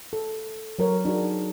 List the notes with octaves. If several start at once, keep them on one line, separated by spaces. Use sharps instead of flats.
A4
F#3 A#4 C#5
D4 D#4 F#4 G#4